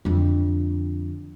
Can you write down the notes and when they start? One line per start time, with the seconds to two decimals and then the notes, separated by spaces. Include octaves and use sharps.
0.05 F2 D3